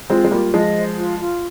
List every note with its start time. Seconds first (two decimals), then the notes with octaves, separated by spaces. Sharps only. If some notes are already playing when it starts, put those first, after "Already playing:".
0.10 G#3 C4 F4
0.25 G#3
0.31 G3 A#3 F4
0.54 F3 G#3 D#5
0.75 C5
0.98 F4
1.20 F4